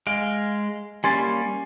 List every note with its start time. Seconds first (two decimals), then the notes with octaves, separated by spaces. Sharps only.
0.07 G#3 F5 D7
1.04 G3 A#3 C#4 G#5 C6 A6